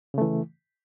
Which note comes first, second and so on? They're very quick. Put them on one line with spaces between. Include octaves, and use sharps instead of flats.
C#3 A3 E3